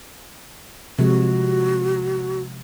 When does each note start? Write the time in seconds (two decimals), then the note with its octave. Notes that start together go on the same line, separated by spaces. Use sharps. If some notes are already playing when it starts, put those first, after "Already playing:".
0.99 C3 F3 G#3 F#4